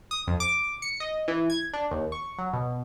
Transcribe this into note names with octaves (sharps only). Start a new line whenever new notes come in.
D#6
F2
D6
C#7
D#5
E3
G#6
D4
D#2
C#6
F#3
B2